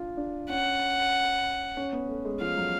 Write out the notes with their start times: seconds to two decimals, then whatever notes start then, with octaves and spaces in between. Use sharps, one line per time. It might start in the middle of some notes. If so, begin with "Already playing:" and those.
Already playing: D4 F4
0.17 D4
0.49 C#4 F#5
1.77 C#4
1.93 B3
2.09 A3
2.25 G#3
2.41 F3 F5
2.57 F#3